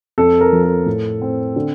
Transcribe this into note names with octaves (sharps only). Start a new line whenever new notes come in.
F2 A4
A#4
F3
A4
A2
C4
D3